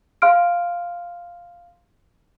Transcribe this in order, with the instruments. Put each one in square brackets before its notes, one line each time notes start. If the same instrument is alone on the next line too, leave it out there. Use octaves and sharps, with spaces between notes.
[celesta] F5 C6 F6 D7